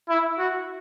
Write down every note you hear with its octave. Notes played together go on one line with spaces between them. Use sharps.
E4
F#4